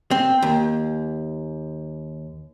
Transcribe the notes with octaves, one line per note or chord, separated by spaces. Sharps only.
C4
D#2